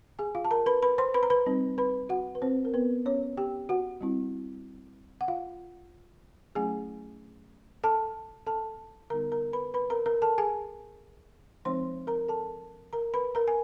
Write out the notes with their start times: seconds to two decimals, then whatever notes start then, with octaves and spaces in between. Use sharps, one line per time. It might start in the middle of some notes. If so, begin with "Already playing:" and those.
0.19 G#4 G#5
0.35 F4 F5
0.45 A5
0.51 A#4 A#5
0.66 B4 B5
0.83 B4 B5
0.98 C5 C6
1.14 B4 B5
1.23 A#5
1.30 B4 B5
1.46 G3 C4 D#4
1.78 B4 B5
2.09 F#4 F#5
2.35 B4
2.42 C4 C5
2.65 A#4
2.74 B3 B4
3.06 C#4 C#5
3.37 G4 G5
3.69 F#4 F#5
4.01 G3 C4 E4
5.21 F#5
5.28 F4 F5
6.55 F#3 A3 C#4 E4 G#4 G#5
7.84 A4 A5
8.47 A4 A5
9.10 D3 G3 B3 D#4 A#4 A#5
9.32 A#4 A#5
9.53 B4 B5
9.74 B4 B5
9.90 A#4 A#5
10.06 A#4 A#5
10.22 A4 A5
10.38 G#4 G#5
11.65 F3 G#3 C4 D#4 C5 C6
12.07 A#4 A#5
12.28 A4 A5
12.93 A#4 A#5
13.14 B4 B5
13.35 A#4 A#5
13.48 G#5